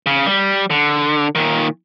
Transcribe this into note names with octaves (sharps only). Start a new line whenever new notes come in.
C#3
G3
D3
A#2 D#3